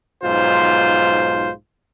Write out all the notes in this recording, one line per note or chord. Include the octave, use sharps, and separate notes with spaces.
B1 G#2 F4 C5